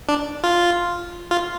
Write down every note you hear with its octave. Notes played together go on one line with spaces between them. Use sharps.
D4
F4
F4